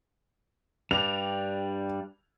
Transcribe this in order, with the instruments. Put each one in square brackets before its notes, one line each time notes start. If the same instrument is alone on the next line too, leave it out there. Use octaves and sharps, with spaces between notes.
[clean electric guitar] G2 G3 D4 [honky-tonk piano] F7